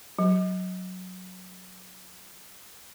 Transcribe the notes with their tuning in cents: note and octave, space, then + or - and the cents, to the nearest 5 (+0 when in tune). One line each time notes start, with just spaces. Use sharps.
F#3 -5